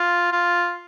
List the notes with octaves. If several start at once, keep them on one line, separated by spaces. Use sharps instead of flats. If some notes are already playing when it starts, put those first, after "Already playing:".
Already playing: F4
F4